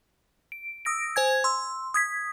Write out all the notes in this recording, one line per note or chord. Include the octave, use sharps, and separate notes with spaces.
D7
D#6 E6 A#6 D7
C5 G#5 G#6
C6 E6
D#6 G#6 B6